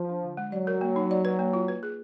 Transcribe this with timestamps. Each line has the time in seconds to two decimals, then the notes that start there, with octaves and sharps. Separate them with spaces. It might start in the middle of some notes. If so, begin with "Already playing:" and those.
Already playing: F3
0.09 D4
0.23 D3
0.37 G#3
0.52 F#3 D5
0.67 A#4
0.81 A#3
0.96 D#4
1.11 D5
1.25 B4
1.39 A#3
1.53 F4
1.68 B4
1.83 G#4